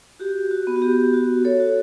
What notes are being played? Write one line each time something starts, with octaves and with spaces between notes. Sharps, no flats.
F#4 G4
F#4
B3
F#4
G4
F#4
A4 C#5
F#4